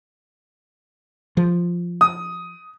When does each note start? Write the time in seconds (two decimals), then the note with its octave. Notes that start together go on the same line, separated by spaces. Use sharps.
1.37 F3
2.01 D#6